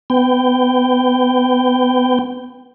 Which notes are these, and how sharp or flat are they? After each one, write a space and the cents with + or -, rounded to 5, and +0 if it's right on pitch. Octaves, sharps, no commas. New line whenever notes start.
B3 +25 G5 +0